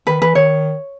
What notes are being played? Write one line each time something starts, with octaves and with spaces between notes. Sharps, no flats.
D#3 B4
E3 B4
D#3 C#5